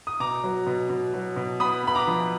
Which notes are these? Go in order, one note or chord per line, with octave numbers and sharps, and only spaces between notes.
D#6
B2 A#5 D6
F#3
B2
B2
F#3
B2
B3 B5 D#6
B3 B5
A#5 D6
F3